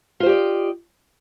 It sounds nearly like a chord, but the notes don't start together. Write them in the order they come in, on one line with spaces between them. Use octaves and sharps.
F4 C5 G4 D5 D#5